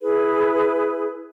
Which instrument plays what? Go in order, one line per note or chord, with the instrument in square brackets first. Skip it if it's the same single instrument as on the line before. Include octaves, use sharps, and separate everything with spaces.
[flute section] E4 G#4 B4